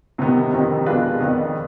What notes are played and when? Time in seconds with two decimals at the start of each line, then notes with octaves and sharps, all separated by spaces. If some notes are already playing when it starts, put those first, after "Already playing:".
0.18 C2 C3 D#3 G3 B3
0.52 F2 C3 D#3
0.86 B2 G#3 D4 F4 B4
1.20 F2 D#3 B3